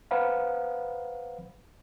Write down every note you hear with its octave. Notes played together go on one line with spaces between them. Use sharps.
B4 C5 F5 F#5 A#5 B5